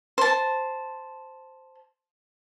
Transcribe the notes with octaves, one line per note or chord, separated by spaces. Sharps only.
C5 A5